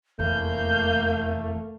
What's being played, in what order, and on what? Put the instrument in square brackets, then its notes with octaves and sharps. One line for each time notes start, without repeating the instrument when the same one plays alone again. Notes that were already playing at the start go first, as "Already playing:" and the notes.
[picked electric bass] F1 E2 [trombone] A3 [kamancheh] A#3 [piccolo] G6